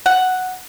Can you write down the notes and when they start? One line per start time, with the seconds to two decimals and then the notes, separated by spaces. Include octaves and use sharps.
0.06 F#5